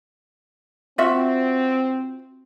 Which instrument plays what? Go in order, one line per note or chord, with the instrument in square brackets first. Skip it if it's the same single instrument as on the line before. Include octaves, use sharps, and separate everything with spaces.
[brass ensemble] C4 [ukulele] F4 F#4 E5